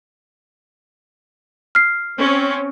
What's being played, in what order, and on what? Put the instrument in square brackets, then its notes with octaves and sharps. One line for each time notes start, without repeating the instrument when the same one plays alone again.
[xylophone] F6 C7
[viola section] C4 C#4